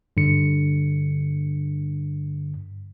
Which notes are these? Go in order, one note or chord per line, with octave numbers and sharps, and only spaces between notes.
G2 D3 C#7